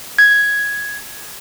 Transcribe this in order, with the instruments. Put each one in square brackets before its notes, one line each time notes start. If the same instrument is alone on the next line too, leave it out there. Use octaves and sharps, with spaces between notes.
[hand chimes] G#6